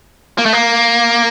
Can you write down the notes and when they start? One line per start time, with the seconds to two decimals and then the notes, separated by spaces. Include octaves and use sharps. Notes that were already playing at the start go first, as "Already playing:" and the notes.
0.38 A#3
0.46 A3
0.53 A#3